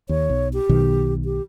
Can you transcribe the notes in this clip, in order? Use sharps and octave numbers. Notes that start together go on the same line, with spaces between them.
D#2 C#5
B1
G4
B1 B2 D#3
G4